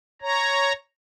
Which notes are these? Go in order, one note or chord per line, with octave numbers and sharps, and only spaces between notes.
C#5 A#5